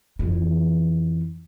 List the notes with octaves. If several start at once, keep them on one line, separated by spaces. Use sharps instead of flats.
F2 E3